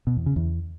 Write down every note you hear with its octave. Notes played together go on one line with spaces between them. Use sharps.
B2
E2
C#3
E2